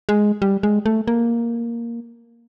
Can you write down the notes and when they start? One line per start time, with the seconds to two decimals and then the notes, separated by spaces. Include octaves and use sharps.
0.09 G#3
0.42 G3
0.63 G#3
0.86 A3
1.08 A#3